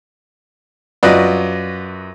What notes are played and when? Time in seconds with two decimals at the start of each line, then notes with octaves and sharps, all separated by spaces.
1.03 F#2 F4 F#4 B4 D5 D#5